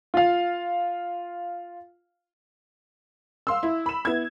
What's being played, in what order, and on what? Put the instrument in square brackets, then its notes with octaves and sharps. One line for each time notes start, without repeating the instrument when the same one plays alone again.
[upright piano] F4 F5
[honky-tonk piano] F5 C6 E6
E4
B5 E7
B3 E4 G#6